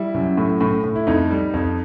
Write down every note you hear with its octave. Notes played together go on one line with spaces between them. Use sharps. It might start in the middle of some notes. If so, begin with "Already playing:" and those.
Already playing: G3 E4
F#2
A2
A2
A2
E4
F2 D#4
G3
F2